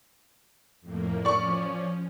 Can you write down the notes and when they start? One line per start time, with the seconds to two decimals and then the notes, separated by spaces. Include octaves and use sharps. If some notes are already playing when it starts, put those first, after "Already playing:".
0.81 F2 A2 A#3
1.25 F3 C#4 D5 C#6